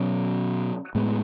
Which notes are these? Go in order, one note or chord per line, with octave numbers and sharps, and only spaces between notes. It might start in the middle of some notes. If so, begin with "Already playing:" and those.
Already playing: B2 F#3 C#4
A2 G#3 B3